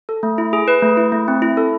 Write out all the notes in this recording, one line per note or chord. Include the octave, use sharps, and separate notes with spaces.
A4
A3
E4
G#4
B4
A3
E4
A3
C4
E4
A4